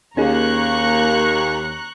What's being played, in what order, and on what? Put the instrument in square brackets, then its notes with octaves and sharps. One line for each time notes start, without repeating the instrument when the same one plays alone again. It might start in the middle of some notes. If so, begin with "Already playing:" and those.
[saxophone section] D#2 [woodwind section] A#3 [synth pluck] C#4 D#4 G#4 [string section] A#5 C#6 F#6